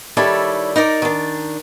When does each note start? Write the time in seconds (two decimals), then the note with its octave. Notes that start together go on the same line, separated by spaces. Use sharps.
0.17 D#3 G3 E4 A4 C#5 D5
0.76 D#4 A#4 D5
1.02 D#3 D4